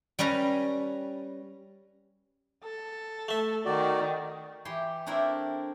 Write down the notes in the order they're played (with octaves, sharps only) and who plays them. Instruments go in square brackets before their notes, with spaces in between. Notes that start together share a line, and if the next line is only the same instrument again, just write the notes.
[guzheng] G3 C#4 B4 G#5 A#5
[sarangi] A4
[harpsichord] A3 E5
[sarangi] D#3 [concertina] F#4 D5
[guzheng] E3 E4 G4 C6
A3 C4 D4 E4 A#4